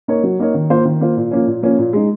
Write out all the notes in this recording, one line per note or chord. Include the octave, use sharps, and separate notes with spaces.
A#3 D#4 A#4 C#5
F#3
A#3 D#4 A#4 C#5
D#3
A#3 F4 C5
D#3
A#3 F4 C5
A#2
F3 A#3 C#4
A#2
F3 A#3 C#4
A#2
G#3 D#4